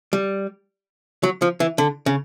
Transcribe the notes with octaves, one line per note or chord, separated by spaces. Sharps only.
G3
F#3
F3
E3
D3
C#3